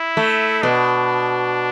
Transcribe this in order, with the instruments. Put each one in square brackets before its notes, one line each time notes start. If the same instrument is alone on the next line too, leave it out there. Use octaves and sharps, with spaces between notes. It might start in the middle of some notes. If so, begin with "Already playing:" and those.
Already playing: [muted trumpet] E4
[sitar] A3
[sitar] B2 [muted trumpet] D4